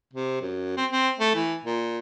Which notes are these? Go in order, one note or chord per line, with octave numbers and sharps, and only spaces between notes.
C3
F#2
C4
C4
A3
E3
A#2